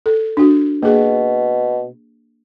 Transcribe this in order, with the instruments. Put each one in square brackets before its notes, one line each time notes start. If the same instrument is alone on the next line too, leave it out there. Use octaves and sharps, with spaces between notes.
[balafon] A4
D4 F#4
[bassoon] B2 [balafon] A#3 G#4